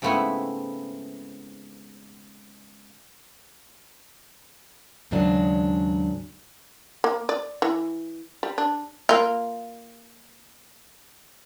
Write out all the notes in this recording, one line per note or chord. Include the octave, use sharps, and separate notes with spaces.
G#2 C#3 A3 B3 C4 E4
D#2 G#2 C#3 F#3 D4
A#3
D5
E3
G3
D4
A#3 F4